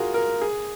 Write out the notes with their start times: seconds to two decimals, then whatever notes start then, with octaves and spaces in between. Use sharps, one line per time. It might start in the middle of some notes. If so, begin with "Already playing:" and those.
Already playing: F4 F#4 G#4 A#4
0.14 A#4
0.41 G#4